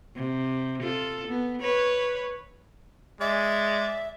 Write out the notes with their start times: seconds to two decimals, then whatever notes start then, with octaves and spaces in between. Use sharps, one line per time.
0.16 C3
0.83 F4 A4
1.28 B3
1.60 B4 C#5
3.21 G#3 D5 E5